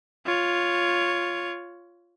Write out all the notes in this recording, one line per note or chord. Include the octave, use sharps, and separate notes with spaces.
F4 C#5